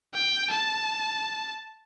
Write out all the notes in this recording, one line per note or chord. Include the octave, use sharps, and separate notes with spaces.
G5
A5